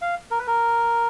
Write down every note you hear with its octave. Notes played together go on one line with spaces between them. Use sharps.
F5
A#4
B4
A#4